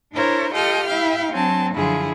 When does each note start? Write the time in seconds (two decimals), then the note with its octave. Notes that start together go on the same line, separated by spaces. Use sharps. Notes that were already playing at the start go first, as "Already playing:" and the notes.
0.13 D4 E4 A#4 C5 C#5
0.52 F4 G4 A4 D#5 G5 F6
0.86 E4 E5 F5 G5
1.30 F#3 C4 D4 G#5 A5
1.74 F#2 D3 F3 E4 F4 G#4